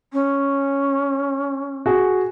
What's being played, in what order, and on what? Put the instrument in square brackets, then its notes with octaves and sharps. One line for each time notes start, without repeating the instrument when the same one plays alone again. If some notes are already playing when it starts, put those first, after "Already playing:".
[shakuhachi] C#4
[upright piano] F#4 G#4